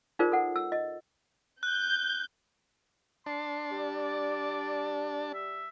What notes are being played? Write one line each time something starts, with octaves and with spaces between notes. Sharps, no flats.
D#4 F4 G#4 A#4 C5 D5
A4 F#5
E6
D#5
F#6 G6
D4 A5 C6
G3
D5
E5